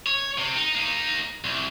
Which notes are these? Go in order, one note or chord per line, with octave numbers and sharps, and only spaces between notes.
C#5
C3
D#4
A#3 D#4
C2